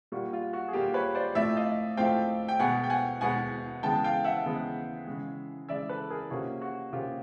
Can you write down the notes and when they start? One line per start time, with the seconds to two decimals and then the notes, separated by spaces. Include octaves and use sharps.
0.12 A#2 G3 A#3 F#4
0.33 F4
0.53 F#4
0.68 G#4
0.73 A#2 G3 A#3 F4 G4
0.94 B4 C#5
1.15 C5 D5
1.35 A2 F3 A3 C4 D5 E5
1.56 D#5 F5
1.97 A2 F3 A3 C4 F5 G5
2.49 G5
2.59 B2 G#3 B3 F#5 G#5
2.84 G5
2.90 F#5 G#5
3.21 B2 G#3 B3 F#5 G#5
3.83 C#3 E3 G#3 B3 G5 A5
4.04 F5 G5
4.24 E5 F#5
4.45 C#3 E3 G#3 B3
5.07 C#3 E3 G#3
5.69 C#3 E3 G#3 D5 E5
5.89 A4 B4
6.10 G#4 A#4
6.30 C3 F3 A#3 C#4 F#4 G#4
6.62 F#4
6.92 C3 F3 A#3 C#4 F4 G4